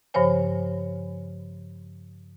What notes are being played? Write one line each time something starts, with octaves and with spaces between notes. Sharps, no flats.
G2 C#3 F3 C5 C#5 G#5